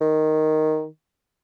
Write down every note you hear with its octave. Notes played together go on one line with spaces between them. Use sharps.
D#3